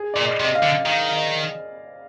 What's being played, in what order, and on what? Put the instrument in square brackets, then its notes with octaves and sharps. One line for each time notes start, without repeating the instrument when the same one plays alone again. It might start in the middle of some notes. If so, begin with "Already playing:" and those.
Already playing: [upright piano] G#4
[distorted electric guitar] A#2 [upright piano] D5
[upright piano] D#5
[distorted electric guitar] C3
[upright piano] D#5
F5
[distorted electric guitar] D3
[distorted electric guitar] D#3 [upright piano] F5
[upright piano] F5
D#5